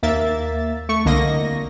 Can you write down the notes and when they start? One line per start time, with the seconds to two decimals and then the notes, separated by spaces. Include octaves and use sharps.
0.03 D#2 A#3 E5 A6
0.89 A3 C#6
1.05 C2 D3 A#3 D#5 A#6